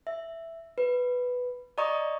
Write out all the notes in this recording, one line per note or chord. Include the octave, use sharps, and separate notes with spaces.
E5
B4
D5 D#5 A#5 C#6 D#6